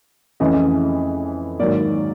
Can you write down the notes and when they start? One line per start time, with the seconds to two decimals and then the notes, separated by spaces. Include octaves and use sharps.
0.40 F2 C#3 E3 A3 C#4 D#5
1.59 G#2 D#3 F#3 A#3 D5